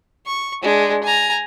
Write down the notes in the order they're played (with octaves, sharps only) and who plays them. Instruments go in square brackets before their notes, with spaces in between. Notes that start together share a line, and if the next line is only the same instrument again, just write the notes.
[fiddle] C#6
G#3 D4
G#5 A#5